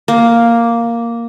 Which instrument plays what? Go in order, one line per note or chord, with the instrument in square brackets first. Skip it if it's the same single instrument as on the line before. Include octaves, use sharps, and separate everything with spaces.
[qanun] A#3